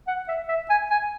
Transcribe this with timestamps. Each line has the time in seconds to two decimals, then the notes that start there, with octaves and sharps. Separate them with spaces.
0.08 F#5
0.28 E5
0.49 E5
0.70 G#5
0.90 G#5